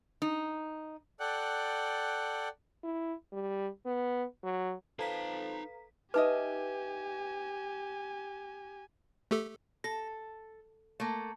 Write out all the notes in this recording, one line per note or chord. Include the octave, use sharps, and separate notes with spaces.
D#4
A4 D5 F#5 G5 F#6
E4
G3
B3
F#3
F3 D#4 A4 B4 F5 A5 A#5 B6
D#4 G4 B4 D#5 E5 G#5 D6
A3 G4 A4
A4 A#6
A3 A#3